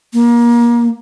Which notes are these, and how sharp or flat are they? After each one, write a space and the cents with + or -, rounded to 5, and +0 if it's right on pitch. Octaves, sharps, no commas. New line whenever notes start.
A#3 +25